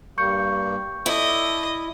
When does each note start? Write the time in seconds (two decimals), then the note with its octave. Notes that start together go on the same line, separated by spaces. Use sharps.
0.18 G2 G3 A#3 C#6 G6 C#7
1.06 E4 A4 D5 D#5